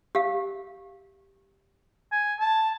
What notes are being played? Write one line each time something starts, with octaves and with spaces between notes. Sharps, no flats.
G4 F5
G#5
A5